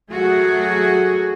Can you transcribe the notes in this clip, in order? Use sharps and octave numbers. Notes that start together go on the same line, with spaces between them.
F#3 A3 F#4 G#4